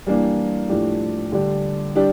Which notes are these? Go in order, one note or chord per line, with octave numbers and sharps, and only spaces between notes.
E3 G3 A#3 D4
A2 F3 A3 D4 G4
D3 G3 D4 G4
G3 D4 G4